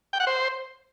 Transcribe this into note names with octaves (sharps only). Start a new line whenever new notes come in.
G5
F#5
C5